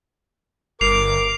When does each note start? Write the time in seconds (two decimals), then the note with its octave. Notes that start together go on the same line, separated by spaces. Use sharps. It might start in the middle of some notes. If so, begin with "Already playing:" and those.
0.81 G1 A#4 D6 C7 F7